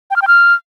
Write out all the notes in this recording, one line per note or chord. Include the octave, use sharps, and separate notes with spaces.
G5
F6
G5
F6